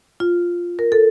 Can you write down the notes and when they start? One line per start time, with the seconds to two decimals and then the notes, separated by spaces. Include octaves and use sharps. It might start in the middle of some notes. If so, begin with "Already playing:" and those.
0.20 F4
0.79 A#4
0.92 A4